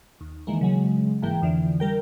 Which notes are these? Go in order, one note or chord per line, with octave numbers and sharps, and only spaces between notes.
D#2
D#3 E3 G#3 A#3
C#3 F#3 G#3
G1 G#2 E3 A#3 G5
F2 D3 E3
G3 A#4 G5